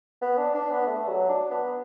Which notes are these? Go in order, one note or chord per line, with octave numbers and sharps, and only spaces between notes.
B3
D4
D4
B3
A3
F#3
D4
B3